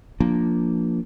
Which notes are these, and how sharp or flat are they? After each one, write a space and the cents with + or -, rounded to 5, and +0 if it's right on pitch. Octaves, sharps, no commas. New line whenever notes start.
F3 +0 A#3 +0 D4 +0